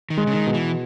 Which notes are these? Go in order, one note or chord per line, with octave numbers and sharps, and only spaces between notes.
D#3
G#3
C#3
D#3
B2
E3